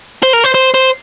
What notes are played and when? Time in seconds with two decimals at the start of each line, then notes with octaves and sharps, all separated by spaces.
0.23 C5
0.33 A#4
0.44 C5
0.54 C5
0.74 C5